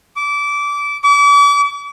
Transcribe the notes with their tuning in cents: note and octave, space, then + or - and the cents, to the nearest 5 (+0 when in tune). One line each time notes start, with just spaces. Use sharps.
D6 -25
D6 -40